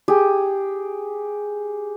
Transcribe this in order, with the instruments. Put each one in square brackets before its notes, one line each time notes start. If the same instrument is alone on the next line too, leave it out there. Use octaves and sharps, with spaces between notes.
[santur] G4 G#4